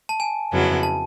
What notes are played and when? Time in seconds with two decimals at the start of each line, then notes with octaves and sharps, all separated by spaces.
0.09 A5
0.20 G#5
0.52 F2 C#3 F#3 B3 E4
0.83 A5